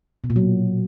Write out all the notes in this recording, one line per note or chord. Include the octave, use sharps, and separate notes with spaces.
B2
A#2
F#3